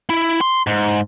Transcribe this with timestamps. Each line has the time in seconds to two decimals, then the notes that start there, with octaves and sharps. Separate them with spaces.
0.10 E4
0.41 C6
0.67 G#2